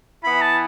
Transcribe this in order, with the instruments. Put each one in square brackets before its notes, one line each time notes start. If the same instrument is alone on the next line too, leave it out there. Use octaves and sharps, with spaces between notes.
[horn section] E3 B3 E4 [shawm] B5
[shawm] A5